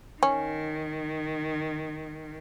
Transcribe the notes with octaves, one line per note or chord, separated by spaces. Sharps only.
D#3 C#4